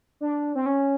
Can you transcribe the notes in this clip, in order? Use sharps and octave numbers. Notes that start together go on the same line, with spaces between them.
D4
C4
C#4